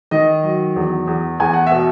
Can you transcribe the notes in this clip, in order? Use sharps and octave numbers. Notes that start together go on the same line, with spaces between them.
D#3 D#5
F#3
E2
E2
E2 G#5
F#5
B2 E5